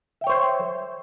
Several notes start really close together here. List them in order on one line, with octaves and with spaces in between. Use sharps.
E5 G5 C#5 C5